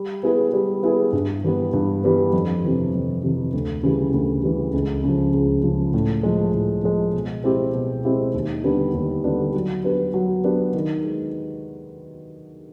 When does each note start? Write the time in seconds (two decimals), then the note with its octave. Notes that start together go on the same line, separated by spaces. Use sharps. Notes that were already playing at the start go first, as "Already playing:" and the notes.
Already playing: G3
0.23 B3 E4 G#4 B4
0.53 G3
0.83 B3 E4 G#4 B4
1.13 G2
1.44 E3 G3 B3
1.73 G2
2.04 E3 G3 B3
2.33 F2
2.64 C3 E3
2.94 F2
3.24 C3 E3
3.53 D2
3.83 C#3 E3 G3
4.14 D2
4.43 C#3 E3 G3
4.74 C#2
5.04 C#3 F3
5.34 C#2
5.63 C#3 F3
5.94 A2
6.23 F3 G#3
6.53 A2
6.84 F3 G#3
7.14 B2
7.44 G#3 C4 E4 G4
7.74 B2
8.04 G#3 C4 E4 G4
8.34 D#2
8.64 D3 G3 B3 D4
8.94 D#2
9.24 D3 G3 B3 D4
9.54 F#3
9.84 B3 D4 G4 B4
10.14 F#3
10.44 B3 D4 G4 B4
10.74 D#3
11.04 G#3